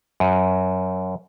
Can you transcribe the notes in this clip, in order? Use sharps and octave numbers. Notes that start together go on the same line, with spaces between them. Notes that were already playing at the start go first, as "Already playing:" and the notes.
F#2